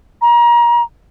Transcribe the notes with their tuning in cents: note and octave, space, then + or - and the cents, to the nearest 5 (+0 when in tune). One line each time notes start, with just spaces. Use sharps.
A#5 +30